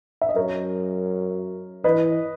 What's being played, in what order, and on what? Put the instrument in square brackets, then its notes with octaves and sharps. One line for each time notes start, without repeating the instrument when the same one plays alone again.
[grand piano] E5
D#5
[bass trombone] F#2 [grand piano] A#4 C#5
[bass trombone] E3 [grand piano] B4 D#5